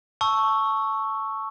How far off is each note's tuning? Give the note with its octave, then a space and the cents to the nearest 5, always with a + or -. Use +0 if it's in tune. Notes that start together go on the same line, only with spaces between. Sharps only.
A5 +0 C#6 +0 E6 +0